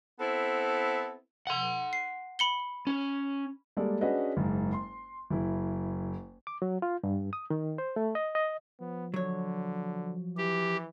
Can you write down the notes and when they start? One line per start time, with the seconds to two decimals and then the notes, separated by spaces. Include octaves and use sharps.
0.20 B3 C4 E4 A4
1.47 F#5 C6
1.93 C7
2.39 B5 C#7 G7
2.87 C#4
3.77 G3 G#3 A#3 A4 D5
4.01 C#4 D4 F#4 G#4 B4 D#5
4.37 F#1 G#2
4.73 C6
5.30 F#1 E4
6.47 D6
6.62 F#3
6.82 F4
7.03 G2
7.33 D#6
7.50 D#3
7.78 C5
7.96 A3
8.15 D#5
8.35 D#5
8.80 F3 B3
9.14 D3 F#3 C#5
10.37 E3 G4